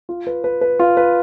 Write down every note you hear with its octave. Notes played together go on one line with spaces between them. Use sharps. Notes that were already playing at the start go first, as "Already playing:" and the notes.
F4
B4
B4
B4
F4
B4